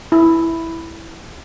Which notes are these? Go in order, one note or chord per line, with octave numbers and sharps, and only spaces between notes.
E4